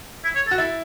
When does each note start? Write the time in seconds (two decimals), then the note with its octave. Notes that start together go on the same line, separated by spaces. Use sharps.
0.24 E4
0.35 C#5
0.47 A4
0.51 F#4
0.58 E4 A4